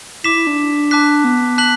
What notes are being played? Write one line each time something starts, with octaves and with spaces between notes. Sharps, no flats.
E4 D6 B6 E7
E4
D4
A5 D6 F#6 B6
B3
A5 F#6 B6 F#7